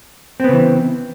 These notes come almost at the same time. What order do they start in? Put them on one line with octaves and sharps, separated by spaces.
C4 B3 C#3 E3